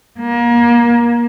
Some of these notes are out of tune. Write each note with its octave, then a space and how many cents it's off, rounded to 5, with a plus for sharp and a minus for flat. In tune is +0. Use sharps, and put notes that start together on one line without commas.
A#3 +30